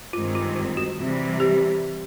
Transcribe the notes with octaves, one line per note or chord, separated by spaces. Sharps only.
G2 D#3 G#3 C4 F4
F4
F4
F#4
C3 E3 G3
G4